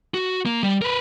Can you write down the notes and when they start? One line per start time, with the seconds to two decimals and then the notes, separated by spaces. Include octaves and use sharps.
0.14 F#4
0.46 A#3
0.63 G3
0.82 A#4 B4